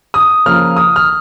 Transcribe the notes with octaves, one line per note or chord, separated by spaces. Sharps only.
D#6
C#3 F3 A#3 F6
D#6
F6